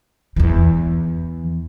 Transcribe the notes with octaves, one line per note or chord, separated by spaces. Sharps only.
E2 E3